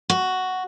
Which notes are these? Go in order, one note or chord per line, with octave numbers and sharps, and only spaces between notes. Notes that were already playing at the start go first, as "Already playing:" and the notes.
F#4